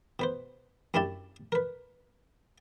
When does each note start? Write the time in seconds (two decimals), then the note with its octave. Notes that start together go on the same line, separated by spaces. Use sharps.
0.19 B2 B4 C5
0.94 F#2 C#4 D4 E4 G4 A5
1.52 A#4 B4